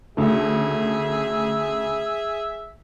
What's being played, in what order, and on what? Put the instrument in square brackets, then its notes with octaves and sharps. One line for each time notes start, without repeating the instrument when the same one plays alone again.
[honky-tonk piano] D2 C#3 A3 [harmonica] G#4 E5